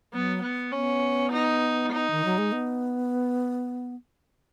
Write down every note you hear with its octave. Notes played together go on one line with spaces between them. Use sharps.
F#3 B3
B3
B3 C#4
D#4
D#4
D#3
F#3
G#3
B3